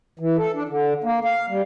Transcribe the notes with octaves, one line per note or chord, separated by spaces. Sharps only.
E3
A4
D4
D3
A#3
F5
G3